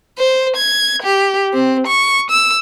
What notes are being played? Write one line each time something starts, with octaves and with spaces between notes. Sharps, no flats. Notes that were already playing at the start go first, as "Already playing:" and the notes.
C5
G#6
G4
C4
C#6
E6